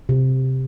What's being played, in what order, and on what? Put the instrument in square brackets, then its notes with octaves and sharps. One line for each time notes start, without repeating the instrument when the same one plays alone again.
[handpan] C3